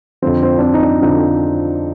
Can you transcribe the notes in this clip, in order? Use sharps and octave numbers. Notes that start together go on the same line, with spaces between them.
F2 D3 F3 C4
C4
D4
C4
D#4
D4
F2 D3 F3 D#4